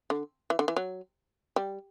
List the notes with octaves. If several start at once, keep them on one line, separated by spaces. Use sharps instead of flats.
D3
E3
D3
E3
F#3
G3